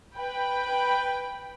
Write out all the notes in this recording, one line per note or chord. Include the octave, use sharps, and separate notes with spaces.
B4 G5 B5